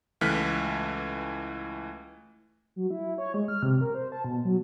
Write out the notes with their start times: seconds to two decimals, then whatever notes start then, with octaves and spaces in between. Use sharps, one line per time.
0.21 C#2 E3 A3 F6 F#6 B6
2.76 F#3
2.90 E4
3.18 C#5
3.34 G#3
3.48 F6
3.63 C3
3.81 A#4
3.95 C5
4.12 A5
4.24 B2
4.45 F#3